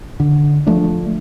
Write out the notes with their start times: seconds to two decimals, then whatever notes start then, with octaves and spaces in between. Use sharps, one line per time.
0.20 D3
0.67 F3 A3 D4